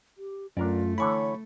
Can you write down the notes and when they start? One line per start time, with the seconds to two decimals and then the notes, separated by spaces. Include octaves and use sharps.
0.18 G4
0.57 F#2 A3 D4 F4 A#4 D5
0.98 D3 E3 E4 C#5 B5 C#6